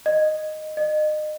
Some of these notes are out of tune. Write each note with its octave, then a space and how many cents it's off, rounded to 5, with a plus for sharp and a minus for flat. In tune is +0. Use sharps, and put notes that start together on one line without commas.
D#5 -10
D#5 -30